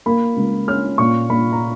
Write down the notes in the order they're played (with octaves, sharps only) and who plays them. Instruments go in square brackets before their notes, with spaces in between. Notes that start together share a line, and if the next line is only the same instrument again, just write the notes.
[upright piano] A#3 B5
C#2
C#4 F6
A#2 C#6
A#2 B5
A#5